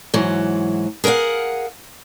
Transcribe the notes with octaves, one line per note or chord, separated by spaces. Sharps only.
G#2 E3 F#3
G#4 A#4 B4 F5 F#5